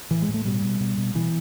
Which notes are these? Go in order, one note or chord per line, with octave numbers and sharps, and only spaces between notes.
A2 E3
G#3
A2
A3
B2 G3
B2
B2
B2
B2 E3